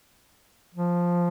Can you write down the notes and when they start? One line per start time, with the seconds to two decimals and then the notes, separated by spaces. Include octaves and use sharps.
0.75 F3